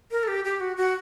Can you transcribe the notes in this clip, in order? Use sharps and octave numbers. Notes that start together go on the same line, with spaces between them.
A#4
A4
G4
G4
F#4
F#4